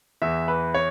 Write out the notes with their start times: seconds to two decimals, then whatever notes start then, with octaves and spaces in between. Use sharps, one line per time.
0.22 E2 E3 E5
0.48 B4
0.75 C#5